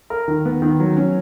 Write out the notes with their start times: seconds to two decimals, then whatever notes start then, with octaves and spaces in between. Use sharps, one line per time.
0.10 A#4
0.28 D#3
0.45 B3
0.62 D#3
0.80 F#3
0.97 C#4